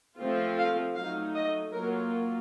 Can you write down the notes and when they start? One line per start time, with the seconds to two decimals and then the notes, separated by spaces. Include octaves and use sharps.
0.19 F3 A3 C4 F4
0.57 F5
0.96 F#3 A3 D#4 F5
1.34 D#5
1.72 F#3 A#3 F4 A#4